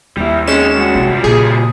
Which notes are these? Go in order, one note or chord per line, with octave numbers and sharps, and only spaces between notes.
D#2 G3 E4
C3 D#3 G#3 C#4 E7
G2 F#4
C3
F3 G3
A#2 C#3 G#4